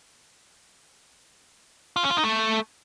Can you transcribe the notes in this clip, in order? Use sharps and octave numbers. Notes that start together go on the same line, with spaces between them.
F4
C#4
F4
D#4
A3